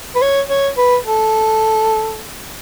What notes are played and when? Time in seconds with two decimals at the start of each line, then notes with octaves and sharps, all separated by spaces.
0.15 B4
0.22 C#5
0.49 C#5
0.77 B4
1.05 A4